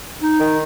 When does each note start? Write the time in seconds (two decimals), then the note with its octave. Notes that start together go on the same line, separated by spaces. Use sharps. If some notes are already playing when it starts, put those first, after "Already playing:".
0.22 D#4
0.40 D#3